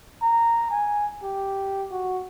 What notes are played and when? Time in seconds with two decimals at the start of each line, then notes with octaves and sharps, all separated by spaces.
0.22 A#5
0.71 G#5
1.23 G4
1.91 F#4